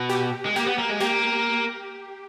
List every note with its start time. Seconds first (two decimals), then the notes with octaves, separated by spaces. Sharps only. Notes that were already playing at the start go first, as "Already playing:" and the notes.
Already playing: B2
0.10 G4
0.46 G#3
0.55 A#3 G4
0.66 B3
0.78 A#3
0.89 G#3
1.00 A#3 G4